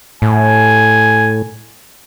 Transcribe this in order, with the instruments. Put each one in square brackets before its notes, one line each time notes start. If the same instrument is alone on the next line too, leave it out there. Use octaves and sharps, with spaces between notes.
[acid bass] A2 [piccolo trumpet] G#5